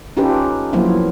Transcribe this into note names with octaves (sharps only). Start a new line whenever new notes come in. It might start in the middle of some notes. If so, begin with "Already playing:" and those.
C#4 D#4 F4 G4 A4 B4
F3 F#3 A#3 B3 E4 F4